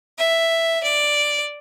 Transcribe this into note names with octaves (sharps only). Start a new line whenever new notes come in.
E5
D5